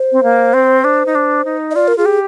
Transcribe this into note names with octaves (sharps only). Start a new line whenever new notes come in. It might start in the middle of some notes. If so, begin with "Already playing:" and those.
Already playing: C5
C4
A#3
C4
D4
D#4
D4
D#4
D#5
F4 D5
A#4
F4 G#4
G4